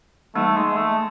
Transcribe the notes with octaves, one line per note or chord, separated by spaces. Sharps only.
E3 G3 A3 A#3 D#4
G#3
A3